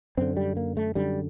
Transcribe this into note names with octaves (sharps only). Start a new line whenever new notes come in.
F#2 D3 C4
G3
A#3
A3
F#2 D3 G3